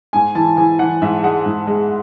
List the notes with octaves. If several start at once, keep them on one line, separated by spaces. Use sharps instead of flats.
G#2 G#5
E3 A5
E3 G#5
E3 F#5
G#2 E5
G#3 F#5
G#2
G#3